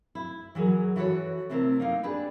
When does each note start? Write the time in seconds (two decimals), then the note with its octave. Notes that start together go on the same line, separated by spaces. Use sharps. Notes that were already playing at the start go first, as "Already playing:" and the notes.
0.15 E4
0.55 E3 F#3 G#4 A#4
0.96 E3 F#4 A4 B4 C#5
1.49 C3 A3 C4 E4 A#4
1.80 A#3 D#4 F5
2.03 D4 G4 G#4 B4